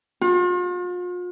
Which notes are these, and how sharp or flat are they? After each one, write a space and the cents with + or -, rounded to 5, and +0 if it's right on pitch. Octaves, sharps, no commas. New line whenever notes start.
F4 +40